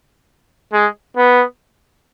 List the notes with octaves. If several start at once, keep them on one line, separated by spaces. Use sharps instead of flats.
G#3
B3